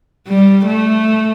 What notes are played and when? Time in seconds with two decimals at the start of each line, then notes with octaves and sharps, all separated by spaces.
0.27 G3
0.66 A3